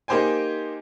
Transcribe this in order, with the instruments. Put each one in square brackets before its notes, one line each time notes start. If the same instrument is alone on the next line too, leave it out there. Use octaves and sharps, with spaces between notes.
[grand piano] A#3 D#4 G4 C5 G5 G#5